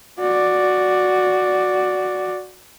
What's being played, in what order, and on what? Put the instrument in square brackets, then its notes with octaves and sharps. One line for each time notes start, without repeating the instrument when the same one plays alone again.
[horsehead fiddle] F#4 D5